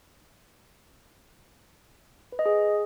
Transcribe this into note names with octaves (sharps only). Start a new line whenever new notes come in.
B4
D#5
G#4